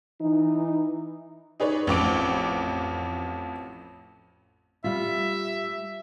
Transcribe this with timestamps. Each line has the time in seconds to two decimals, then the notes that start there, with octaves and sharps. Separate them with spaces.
0.21 E3 D#4
1.60 D#4 G#4 B4 C#5 D5
1.87 A1 F2 D6 D7
4.84 G3 F4 E5